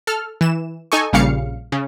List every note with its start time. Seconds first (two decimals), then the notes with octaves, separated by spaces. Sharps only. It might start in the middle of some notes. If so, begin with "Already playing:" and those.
0.07 A4 F6
0.41 E3 E7
0.92 D#4 A4 G#5 C#6
1.13 A#1 A#2 C#3 G3 F5 C#7
1.72 C#3